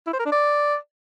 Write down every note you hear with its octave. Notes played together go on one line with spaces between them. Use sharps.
E4
C5
A#4
D4
D5